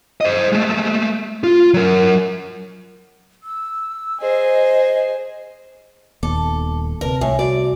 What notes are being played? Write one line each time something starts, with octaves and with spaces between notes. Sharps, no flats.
C5 D#5
G#3 A3
F4
F#3 A#4
E6
G#4 C5 D#5
D#1 D#2 B3 A4 D6
D2 C3 A#4 B4 A5
C2 A2 G#5
F#4 D5